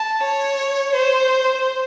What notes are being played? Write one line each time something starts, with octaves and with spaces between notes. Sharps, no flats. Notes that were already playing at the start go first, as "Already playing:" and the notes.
Already playing: A5
C#5
C5